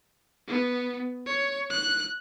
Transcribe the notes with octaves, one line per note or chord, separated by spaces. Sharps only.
B3
C#5
F#6